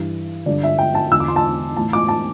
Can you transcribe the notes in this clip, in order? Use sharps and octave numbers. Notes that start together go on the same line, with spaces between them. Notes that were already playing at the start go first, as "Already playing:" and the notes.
Already playing: G2 E3
G2 D3 D5
E5
G5
A5
E2 D3 E6
D6
C6
A5
A2 E3 A5
D6
A5